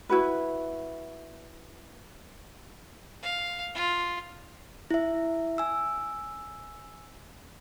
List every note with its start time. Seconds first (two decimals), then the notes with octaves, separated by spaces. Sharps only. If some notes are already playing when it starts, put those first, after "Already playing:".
0.09 E4 F#4 B4
3.23 F5
3.75 F4
4.91 E4 E5
5.58 G#5 E6